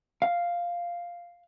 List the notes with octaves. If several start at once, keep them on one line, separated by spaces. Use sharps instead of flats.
F5